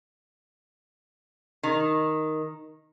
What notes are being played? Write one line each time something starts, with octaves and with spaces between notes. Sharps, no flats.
D#3